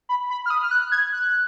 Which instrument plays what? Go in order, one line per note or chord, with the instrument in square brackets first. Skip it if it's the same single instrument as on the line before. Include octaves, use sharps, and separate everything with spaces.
[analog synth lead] B5
B5
F6
D#6
F6
F#6
G#6
F#6